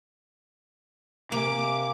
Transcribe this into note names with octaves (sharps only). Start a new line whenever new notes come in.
C3 A#3 F5 G#5 D6